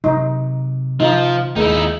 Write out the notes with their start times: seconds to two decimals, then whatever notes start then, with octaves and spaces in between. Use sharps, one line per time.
0.04 C3 F#3 D#4
1.00 F3 D#4
1.56 D#2 G#3 D#4 E4